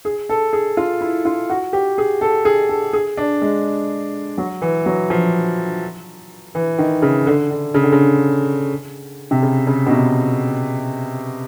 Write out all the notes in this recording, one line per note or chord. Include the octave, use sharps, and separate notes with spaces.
G#4
A4
G#4
F4
E4
F4
F#4
G4
G#4
A4
G#4
A4
G#4
D4
G#3
F#3
E3
F#3
F3
E3
D#3
C#3
D3
D3
C#3
D3
C#3
C3
C#3
C#3
B2
C3